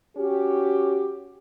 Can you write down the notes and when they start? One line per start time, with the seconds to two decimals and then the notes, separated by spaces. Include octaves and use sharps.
0.17 C#4 F#4 G4